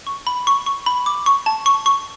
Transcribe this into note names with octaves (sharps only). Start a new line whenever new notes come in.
C#6
B5
C#6
C#6
B5
D6
C#6
A5
C#6
C#6